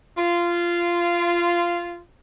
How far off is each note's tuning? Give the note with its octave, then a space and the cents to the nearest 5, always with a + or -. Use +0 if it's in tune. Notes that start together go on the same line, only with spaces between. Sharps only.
F4 -15